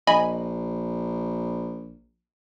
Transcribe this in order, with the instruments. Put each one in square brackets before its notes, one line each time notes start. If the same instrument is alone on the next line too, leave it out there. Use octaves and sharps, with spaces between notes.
[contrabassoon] A#1 [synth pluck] D#5 G#5 B5